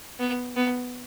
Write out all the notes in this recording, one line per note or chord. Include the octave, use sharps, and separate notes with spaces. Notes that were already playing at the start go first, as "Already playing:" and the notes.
B3
B3